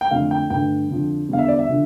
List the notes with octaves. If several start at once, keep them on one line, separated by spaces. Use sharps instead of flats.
G5
F2 D3 F3 A3 F5
G5
G2 D3 A3 G5
F2 D3 F3
E2 D3 G3 F5
E5
D5
E5
D3 F3